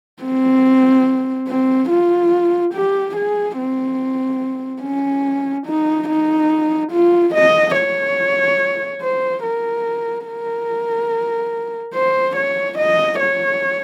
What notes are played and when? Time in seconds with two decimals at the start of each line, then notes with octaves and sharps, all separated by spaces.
0.23 C4
1.48 C4
1.90 F4
2.74 G4
3.16 G#4
3.58 C4
4.82 C#4
5.67 D#4
6.08 D#4
6.92 F4
7.34 D#5
7.76 C#5
9.02 C5
9.43 A#4
10.27 A#4
11.94 C5
12.36 C#5
12.78 D#5
13.20 C#5